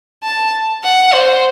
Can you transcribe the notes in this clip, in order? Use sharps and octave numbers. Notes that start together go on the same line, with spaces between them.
A5
F#5
C5